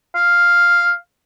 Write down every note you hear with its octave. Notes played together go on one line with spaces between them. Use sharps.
F5